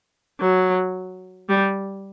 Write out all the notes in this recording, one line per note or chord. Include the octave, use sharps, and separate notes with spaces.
F#3
G3